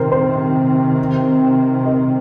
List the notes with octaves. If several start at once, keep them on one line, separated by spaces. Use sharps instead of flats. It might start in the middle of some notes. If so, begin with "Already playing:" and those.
Already playing: C3 D#3 C4 A#4 C5
C5
A#4 D#5